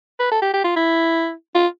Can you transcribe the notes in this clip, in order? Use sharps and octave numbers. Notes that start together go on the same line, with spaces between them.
B4
A4
G4
G4
F4
E4
F4